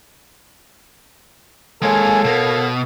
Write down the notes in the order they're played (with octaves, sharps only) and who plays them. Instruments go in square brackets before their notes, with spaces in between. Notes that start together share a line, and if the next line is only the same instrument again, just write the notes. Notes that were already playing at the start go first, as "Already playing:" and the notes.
[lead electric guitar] G#3 A#3 [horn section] A4 C#5 F5 [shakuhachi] G#5
[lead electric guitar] B2 [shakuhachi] A#4